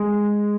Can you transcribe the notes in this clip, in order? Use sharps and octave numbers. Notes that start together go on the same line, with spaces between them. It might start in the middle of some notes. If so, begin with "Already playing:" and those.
Already playing: G#3